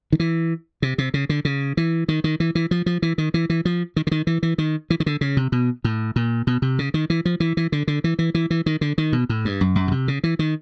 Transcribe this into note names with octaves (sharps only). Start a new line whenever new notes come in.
D#3
E3
C3
C3
C#3
D3
C#3
E3
D#3
D#3
E3
E3
F3
F3
E3
D#3
E3
E3
F3
D#3
D3
D#3
E3
E3
D#3
E3
D#3
D3
C#3
C3
B2
A2
A#2
B2
C3
C#3
D#3
E3
F3
E3
E3
D3
D3
E3
E3
E3
E3
D#3
D3
D#3
B2
A2
G2
F#2
F#2
B2
C3
C#3
E3
D#3